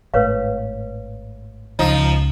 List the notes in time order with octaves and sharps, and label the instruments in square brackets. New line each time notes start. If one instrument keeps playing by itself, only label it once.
[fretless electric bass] G#1 A2 [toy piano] B4 C#5 F5
[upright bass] C#2 [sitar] F3 D#4